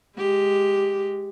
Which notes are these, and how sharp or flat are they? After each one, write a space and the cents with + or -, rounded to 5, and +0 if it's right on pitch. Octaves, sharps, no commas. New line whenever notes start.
G#3 +0 G4 +0